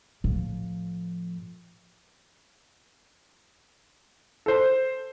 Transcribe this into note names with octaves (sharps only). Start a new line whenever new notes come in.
A2 F3
A4 C5